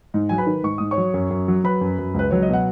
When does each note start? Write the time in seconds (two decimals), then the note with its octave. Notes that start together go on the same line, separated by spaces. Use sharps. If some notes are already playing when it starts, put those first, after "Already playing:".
0.14 G#2
0.29 F#3 G#5
0.38 B4 B5
0.47 D#3
0.63 G#2 C#6
0.78 G#2 D#6
0.91 C#5 C#6
0.98 F#3
1.14 F#2
1.31 F#2
1.48 F#3
1.64 F#3 B4 B5
1.81 F#2
1.99 F#2
2.14 C#2 B4
2.31 F#3 C#5
2.42 D#5
2.49 B2 F#5